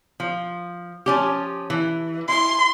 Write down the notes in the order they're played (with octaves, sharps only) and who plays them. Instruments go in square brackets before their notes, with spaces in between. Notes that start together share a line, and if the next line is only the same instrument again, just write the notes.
[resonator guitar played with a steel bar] F3
F3 C#4 G4
E3
[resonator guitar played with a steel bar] E4 [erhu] C6